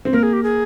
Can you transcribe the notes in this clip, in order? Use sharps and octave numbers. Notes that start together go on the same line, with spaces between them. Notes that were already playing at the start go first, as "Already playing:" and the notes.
C4
A#3 A#4
G#4
G4
G#4